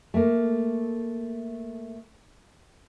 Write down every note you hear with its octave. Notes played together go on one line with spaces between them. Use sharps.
A3 A#3